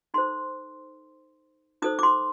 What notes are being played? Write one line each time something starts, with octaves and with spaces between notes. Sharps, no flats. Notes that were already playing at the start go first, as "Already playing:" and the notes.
D#4 A4 C5 C6
D#4 A4 C5 D#6
D6
C6